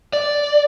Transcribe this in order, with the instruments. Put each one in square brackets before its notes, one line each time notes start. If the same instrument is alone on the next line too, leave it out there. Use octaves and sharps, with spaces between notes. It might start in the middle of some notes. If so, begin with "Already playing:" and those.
[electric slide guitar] D5